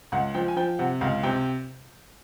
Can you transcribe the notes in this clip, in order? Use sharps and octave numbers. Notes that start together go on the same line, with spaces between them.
C#2 F#5
F3 G5
G#5
F3 G5
C3 F#5
C#2 F5
C3 G5